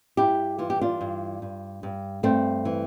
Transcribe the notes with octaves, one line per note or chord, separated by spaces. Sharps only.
G2 E4 G4
E3 F4
G4
D4 F4
G2
G2
G2
G2 A3 C4
E3